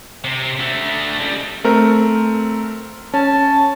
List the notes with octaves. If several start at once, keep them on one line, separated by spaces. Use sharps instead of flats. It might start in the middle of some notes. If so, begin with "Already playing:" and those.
C3
D3 A3
C#2 G3
A3 C4 A#4
C#4 A5